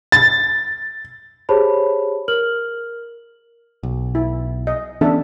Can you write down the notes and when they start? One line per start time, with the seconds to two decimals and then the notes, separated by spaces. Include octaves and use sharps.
0.12 A6
1.49 G4 G#4 C5 C#5 A5 B5
2.28 A#4 F6 F#7
3.83 B1
4.15 E4
4.67 D#5
5.01 E3 B3 C#4 D4 A4 E5